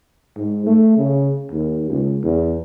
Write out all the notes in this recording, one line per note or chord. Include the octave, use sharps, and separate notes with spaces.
G#2
A3
C#3
D#2
C#2
E2